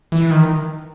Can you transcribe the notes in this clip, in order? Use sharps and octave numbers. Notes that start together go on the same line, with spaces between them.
E3
D#3